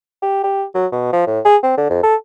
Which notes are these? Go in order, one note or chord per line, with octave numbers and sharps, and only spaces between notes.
G4
G4
F#3
B2
F3
A2
G#4
C4
D3
F2
A4